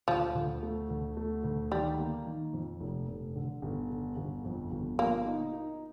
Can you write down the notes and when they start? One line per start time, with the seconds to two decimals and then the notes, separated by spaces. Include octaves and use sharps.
0.08 D2 F3
0.35 D2
0.63 A3
0.90 D2
1.17 A3
1.44 D2
1.72 D#3 G3
1.99 A#3
2.26 D#3
2.53 F2
2.80 F1
3.08 F1
3.36 D3
3.62 G1
3.90 D3
4.17 G1
4.44 F2
4.71 G1
4.99 A#2 A#3
5.26 D#4
5.53 D#4